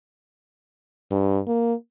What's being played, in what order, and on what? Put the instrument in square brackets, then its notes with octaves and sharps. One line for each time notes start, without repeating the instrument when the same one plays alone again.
[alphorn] G2
A#3